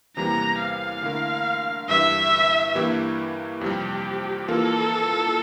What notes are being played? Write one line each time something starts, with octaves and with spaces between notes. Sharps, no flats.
E2 C3 E3 G3 A#3 A#5
F5
D3 A3 E4 A#4
G2 E3 G3 E5
G2 E3 A#3 E4 G4
F2 C3 G3 G4
E3 A#3 F4 A4 A#4